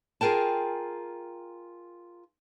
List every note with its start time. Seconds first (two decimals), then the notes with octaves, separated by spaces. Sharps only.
0.21 F4 G#4 A#4 G5 A5